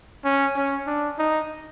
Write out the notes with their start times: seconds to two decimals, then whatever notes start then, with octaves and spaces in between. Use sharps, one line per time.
0.25 C#4
0.55 C#4
0.87 D4
1.19 D#4